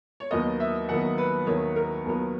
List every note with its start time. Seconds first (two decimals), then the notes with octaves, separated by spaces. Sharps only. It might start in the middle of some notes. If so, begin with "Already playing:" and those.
0.20 C#5
0.31 D#2 D#3 F#3 B3 D#5
0.60 E5
0.89 D#2 D#3 F#3 B3 F#5
1.18 B4
1.46 D#2 D#3 F#3 B3 C#5
1.76 A#4
2.05 D#2 D#3 F#3 B3